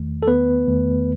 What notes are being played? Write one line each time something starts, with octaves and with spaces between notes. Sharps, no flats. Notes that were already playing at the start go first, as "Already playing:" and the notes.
Already playing: E2 D#3 A3
A4
B3 B4
E2 D#3 A3